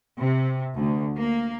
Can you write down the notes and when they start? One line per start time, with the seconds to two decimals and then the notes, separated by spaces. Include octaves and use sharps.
0.21 C3
0.75 D2
1.19 A#3